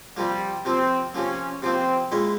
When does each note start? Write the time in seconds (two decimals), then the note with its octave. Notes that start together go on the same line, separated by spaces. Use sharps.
0.17 C3 F3 G3 A#3
0.65 C3 F3 A#3 C4
1.14 C3 F3 A#3 C#4
1.62 C3 F3 A#3 C4
2.12 A#2 G#3 C#4 E4